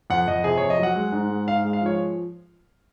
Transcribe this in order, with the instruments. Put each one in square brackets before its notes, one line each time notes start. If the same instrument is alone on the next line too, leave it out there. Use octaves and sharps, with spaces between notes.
[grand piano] F2 F#5
F2 D#5
C3 G#4
F2 C#5
D#5
F#3 F#5
G#3
G#2
G#3
G#2 F5
G#3
F5
F3 C#5